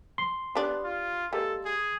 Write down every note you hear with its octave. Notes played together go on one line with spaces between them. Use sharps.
C6
G3 B3 D4
F4
G3 G#3 A#3 A4
G#4